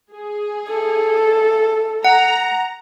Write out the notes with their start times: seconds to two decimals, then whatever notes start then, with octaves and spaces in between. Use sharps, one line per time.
0.12 G#4
0.68 A4
2.05 F#5 A#5